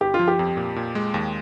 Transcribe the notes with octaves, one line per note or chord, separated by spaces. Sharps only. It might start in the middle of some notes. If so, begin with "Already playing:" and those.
G1 G4
F4
F3
G4
F2
A#2
A#2
G#3
D#2